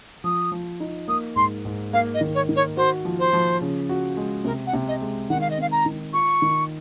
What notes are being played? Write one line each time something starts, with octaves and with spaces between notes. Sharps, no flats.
F3 D#6
F3
D#4
A#3 D#6
G#2 C6
G#2
A#3 F5
D#5
D#3
C#5
D#3
C#5
F#4 C5
F3
C5
F3
C#3
F#4
G#3
C3 A#4
F#5
C3
D#5
G#3
D#3 F#5
F5
D#5
C4 F5
A#5
D#3
F4 C#6
D#3